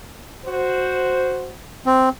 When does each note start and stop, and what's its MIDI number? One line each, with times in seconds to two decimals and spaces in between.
0.45 1.51 66
0.45 1.51 72
1.86 2.09 60